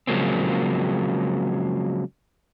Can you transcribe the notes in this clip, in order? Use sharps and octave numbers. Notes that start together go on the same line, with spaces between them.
C#3 F3 F#3 G#3 A#3 C4